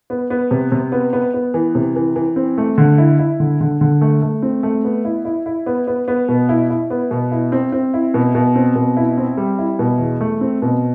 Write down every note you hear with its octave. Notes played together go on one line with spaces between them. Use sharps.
B3
B3
C3
C3
B3
B3
B3
E3
C3
E3
E3
C4
A3
D3
E4
E4
D3
D3
D3
A3
A3
C4
A3
B3
E4
E4
E4
B3
B3
B3
B2
E4
E4
B3
B2
E4
C4
C4
E4
B2
B2
C4
B2
E4
C4
G3
E4
B2
E2
A3
C4
B2